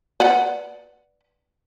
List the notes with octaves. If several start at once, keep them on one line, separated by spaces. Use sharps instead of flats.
B4 D5 F#5